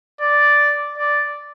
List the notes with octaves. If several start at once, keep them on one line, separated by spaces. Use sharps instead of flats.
D5
D5